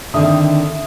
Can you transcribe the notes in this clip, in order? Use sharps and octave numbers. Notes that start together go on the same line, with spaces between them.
D3 D#3 C4 E5 D#6